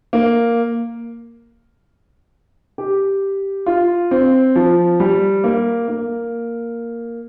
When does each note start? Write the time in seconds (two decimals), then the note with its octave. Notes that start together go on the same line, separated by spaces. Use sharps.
0.13 A#3
2.78 G4
3.66 F4
4.11 C4
4.56 F3
5.00 G3
5.44 A#3
5.88 A#3